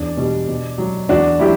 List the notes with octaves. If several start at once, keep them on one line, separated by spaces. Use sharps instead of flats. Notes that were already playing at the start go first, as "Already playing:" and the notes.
Already playing: E2 D4
B2 G3
B2
F#3
E2 D4 F#4
F#3 E4 G4